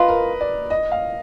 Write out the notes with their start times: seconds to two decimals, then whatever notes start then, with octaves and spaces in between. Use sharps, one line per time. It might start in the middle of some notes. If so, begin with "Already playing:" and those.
Already playing: F4 B4 D#5
0.09 A#4
0.41 D5
0.70 D#5
0.91 F5